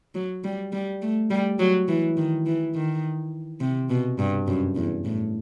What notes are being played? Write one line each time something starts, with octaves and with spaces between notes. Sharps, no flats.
F#3
G3
G3
A3
G3
F#3
E3
D#3
E3
D#3
C3
B2
G2
F#2
E2
A2